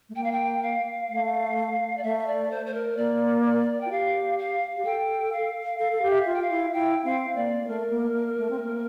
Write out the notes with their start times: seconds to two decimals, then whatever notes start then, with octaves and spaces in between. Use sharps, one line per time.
0.09 A3
0.15 A#3 G5
0.23 F5
0.31 G5
0.62 F5
1.09 A3
1.97 D5
2.03 A3 E5
2.19 E5
2.26 D5
2.50 C5
2.66 C5
2.74 A#4
2.97 A#3 D5
3.45 D5
3.81 G5
3.86 F4
3.90 G4 F5
4.38 F5
4.77 G4
4.85 A4 G5
5.32 F5
5.79 A4 F5
5.92 A4
6.02 G4
6.10 E5
6.26 F4
6.34 G5
6.42 F5
6.50 E4
6.73 E4 G5
7.04 C4 F5
7.35 A#3 D5
7.62 A#3
7.67 A3 A#4
7.90 A#3
8.14 A#3
8.38 A3
8.50 C4
8.60 A#3